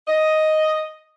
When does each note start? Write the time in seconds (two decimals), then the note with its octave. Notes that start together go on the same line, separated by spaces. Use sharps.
0.08 D#5